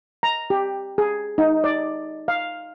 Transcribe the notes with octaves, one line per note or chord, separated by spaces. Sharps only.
A#5
G4
G#4
D#4
D5
F5